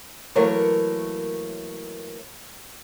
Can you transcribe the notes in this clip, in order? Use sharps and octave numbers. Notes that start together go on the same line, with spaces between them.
E3 F#3 A3 A#3 A#4 C#5